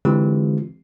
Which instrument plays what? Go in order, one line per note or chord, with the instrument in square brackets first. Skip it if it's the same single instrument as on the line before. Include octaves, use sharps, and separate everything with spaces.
[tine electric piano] D3 E3 G#3 C4 F4 G4